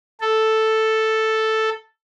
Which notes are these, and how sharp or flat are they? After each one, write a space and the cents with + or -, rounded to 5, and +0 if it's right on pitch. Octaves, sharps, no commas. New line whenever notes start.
A4 +0